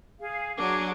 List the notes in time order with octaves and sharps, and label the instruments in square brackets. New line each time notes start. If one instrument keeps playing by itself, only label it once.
[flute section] G#4 F5
[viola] F#3 D4 [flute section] G#4 F#5 D6